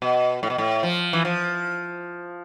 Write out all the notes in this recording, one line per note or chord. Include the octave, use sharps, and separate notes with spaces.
B2
A2
B2
A2
F3
E3
F3